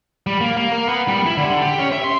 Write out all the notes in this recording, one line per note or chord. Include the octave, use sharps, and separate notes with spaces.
G3
A#3
A#3
A#3
B3
G3
E4
D3
G4
C#4
E5
C6